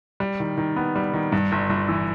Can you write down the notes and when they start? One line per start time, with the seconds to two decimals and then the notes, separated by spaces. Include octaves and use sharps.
0.20 G3
0.40 D#3
0.58 D#3
0.76 B3
0.96 G3
1.14 D#3
1.32 G2
1.52 G1
1.70 G1
1.89 E3